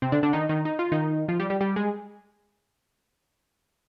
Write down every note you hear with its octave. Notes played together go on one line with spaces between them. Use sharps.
C3 C4
D3 D4
D3 D4
D#3 D#4
D#3 D#4
D#4
F4
D#3 D#4
F3 F4
G3 G4
G3 G4
G3 G4
G#3 G#4